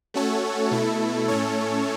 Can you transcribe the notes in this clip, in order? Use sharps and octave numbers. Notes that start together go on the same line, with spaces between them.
A3 C#4 F#4 A4 C#5
B2 A3 E4 A4
A2 A3 C#4 A4 C#5